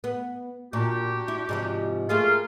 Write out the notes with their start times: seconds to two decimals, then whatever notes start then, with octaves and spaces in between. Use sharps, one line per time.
0.04 B3
0.73 A#2 D4 F#4 G4
1.28 E4
1.49 G#2 C3 F3
2.09 A3 A#3 F4 G#4 F5